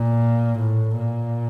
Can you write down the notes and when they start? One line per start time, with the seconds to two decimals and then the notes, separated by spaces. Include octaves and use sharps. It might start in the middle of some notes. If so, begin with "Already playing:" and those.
Already playing: A#2
0.60 A2
0.99 A#2